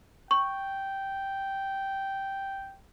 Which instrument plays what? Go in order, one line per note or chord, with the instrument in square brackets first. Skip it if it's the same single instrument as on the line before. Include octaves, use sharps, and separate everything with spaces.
[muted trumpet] G5 [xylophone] C#6